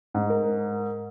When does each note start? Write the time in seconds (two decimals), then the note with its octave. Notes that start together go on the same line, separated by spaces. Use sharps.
0.14 G#2
0.30 A#4